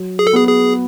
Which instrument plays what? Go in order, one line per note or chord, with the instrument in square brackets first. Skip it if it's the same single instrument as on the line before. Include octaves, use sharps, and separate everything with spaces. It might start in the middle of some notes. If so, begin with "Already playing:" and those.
Already playing: [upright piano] F#3
[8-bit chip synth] G#4
A4
[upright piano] B3 [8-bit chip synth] G#4
[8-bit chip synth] G#4